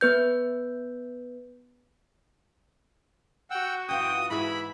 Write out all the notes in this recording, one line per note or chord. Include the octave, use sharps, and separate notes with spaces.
B3 B4 G6
F#4 F#5 G5 E6
F#2 E3 F4 G5 D#6
G#2 E3 E4 G#4 B5